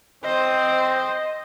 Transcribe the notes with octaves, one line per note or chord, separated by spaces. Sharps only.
C4 C5 D#5